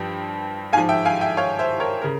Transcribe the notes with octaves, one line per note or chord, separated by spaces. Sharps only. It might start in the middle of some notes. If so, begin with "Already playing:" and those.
Already playing: G2 F3 G5
G#2 F3 F5 G#5
E5 G5
F5 G#5
E5 G5
C#5 F5
C5 E5
A#4 C#5
C#3 A#4